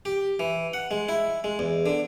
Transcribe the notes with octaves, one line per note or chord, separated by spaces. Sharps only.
G4
E3
F#5
G#3
E4
G#3
E2
D3